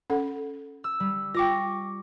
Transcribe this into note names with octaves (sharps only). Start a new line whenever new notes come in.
C#4 A4 F#5
E6
G3
F4 G5 C#6 D6 A#6